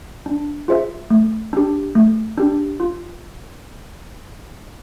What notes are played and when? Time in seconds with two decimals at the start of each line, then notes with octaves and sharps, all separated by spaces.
0.26 D4
0.68 F4 G#4 C5 E5
1.10 A3
1.53 D4 G4
1.95 A3
2.38 D4 G4
2.80 F4